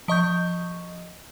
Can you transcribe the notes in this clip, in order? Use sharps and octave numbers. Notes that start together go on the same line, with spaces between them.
F3 D#5 C#6 G6